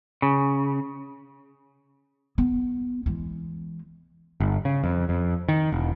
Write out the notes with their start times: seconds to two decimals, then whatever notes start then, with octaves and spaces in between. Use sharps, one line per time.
0.22 C#3
2.38 B3
3.06 E3 G#3
4.40 G1
4.65 C#3
4.84 F2
5.09 F2
5.49 D#3
5.72 E1